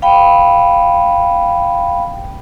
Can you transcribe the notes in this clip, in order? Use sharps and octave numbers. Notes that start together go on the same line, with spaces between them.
F5 G5 B5